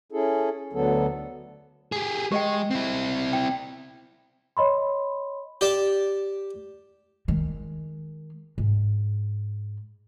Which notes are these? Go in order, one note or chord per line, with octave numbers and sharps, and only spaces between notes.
C#4 E4 G#4 A4
D2 D3 F#3 B3 A4
G4 G#4
G#3 G4 D#5 G5
C4 E4
G5
C#5 D#5 B5 C6
G4 D5 A5
D#3 G#3
G#2